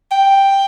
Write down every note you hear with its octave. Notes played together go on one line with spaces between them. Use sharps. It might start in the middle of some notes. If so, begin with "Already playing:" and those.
G5